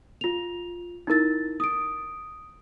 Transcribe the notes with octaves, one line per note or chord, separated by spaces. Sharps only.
F4 F7
D#4 E4 A#4 A6
D#6 D7